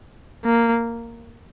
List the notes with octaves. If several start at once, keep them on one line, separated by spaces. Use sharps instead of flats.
A#3